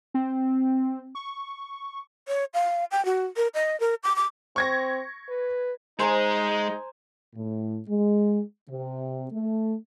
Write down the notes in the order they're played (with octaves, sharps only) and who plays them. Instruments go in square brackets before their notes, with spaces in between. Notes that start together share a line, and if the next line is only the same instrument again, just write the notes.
[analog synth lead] C4
C#6
[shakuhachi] C#5
F5
G5
F#4
A#4
D#5
A#4
D6
D6
[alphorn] C4 [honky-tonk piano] C#6 G#6 A#6
[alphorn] B4
[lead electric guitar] G#3 [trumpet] D#4 [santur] C5 G#5 A#5
[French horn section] A2
G#3
C3
A3